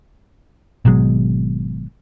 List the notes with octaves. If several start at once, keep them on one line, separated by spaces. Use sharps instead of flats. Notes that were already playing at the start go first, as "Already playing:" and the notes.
G#1 B2 F#3 G#3